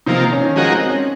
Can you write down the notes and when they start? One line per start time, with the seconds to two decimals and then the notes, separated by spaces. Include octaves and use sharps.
0.06 C3 F3 A#3 D#4
0.32 C#4
0.45 D#3
0.56 F3 G#3 D#4 F#4 A#4
0.72 C4
0.89 C#4